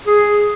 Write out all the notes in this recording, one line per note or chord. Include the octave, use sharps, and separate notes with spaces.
G#4